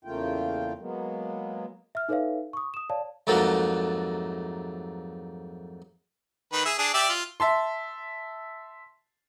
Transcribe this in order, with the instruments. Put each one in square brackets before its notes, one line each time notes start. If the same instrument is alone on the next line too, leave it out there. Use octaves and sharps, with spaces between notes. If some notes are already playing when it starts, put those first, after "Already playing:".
[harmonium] E2 C#3 A3 A#3 F4 G5
F#3 G#3 A#3 B3
[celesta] E5 F6
D#4 A4 B4 C#5 E5 F5
C#6 D#6
D#6 E7
C#5 D5 F5 A5
[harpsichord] F2 G#2 F#3 A3 A#3
[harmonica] D#3 B4
G#4 E5
D4 G#4
G4 D5 E5
F4
[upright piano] E5 A5 C6